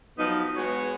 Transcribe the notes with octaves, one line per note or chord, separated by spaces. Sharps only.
F3 F#3 B3 D#4 D#5
G#3 B3 F#4 B4 C#5